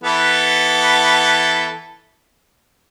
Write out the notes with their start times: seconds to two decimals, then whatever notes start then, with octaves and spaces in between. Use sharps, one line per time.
0.04 E3 B3 A4